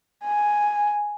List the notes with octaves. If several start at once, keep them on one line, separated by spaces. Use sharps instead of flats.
G#5